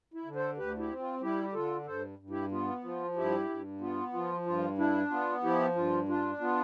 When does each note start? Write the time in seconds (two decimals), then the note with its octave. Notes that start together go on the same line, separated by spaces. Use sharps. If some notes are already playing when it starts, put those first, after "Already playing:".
0.14 E4
0.25 D3
0.35 A4 C5
0.57 D2 G4 B4
0.78 E4 G4
0.89 C4
1.00 F4
1.21 G3 E4 G4
1.43 G4
1.54 D3 F4 A4
1.86 G2 A4 C5
2.19 G2
2.30 E4 G4
2.51 B3 F4
2.84 F3 F4
3.16 G2 E4 G4
3.49 G2
3.81 B3 F4
4.13 F3 F4
4.46 G2 F4
4.78 D4 E4
5.10 B3 F4
5.43 F3 E4 G4
5.75 G2 F4
6.08 D4 F4
6.40 B3 F4